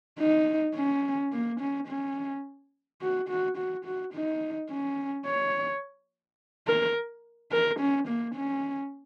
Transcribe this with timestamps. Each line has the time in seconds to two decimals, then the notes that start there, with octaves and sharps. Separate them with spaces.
0.20 D#4
0.75 C#4
1.32 A#3
1.60 C#4
1.88 C#4
3.01 F#4
3.29 F#4
3.57 F#4
3.85 F#4
4.14 D#4
4.70 C#4
5.26 C#5
6.67 A#4
7.52 A#4
7.80 C#4
8.08 A#3
8.36 C#4